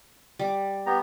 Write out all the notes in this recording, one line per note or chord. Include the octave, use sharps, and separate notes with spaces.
G3 D6
B3 G4 A#5